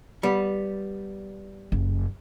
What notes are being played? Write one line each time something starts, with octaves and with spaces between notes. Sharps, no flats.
G3 B3
F#1